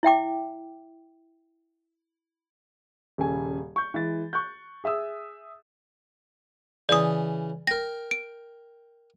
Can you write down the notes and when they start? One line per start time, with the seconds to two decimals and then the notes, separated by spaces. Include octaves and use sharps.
0.03 E4 E5 G5 D6
3.18 D#1 C#3 A4 G#5
3.76 C#6 G6
3.94 E3 G#3 A6
4.33 C#6 F#6 G6
4.84 G#4 E5 D#6 E6
6.89 C#3 E3 D5 A5 D#6
7.67 A#4 G5 A#6
8.11 D7